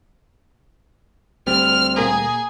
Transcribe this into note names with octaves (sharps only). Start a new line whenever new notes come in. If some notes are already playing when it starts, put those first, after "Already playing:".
D2 G3 C4 F6
A#2 A#3 G#4 A#5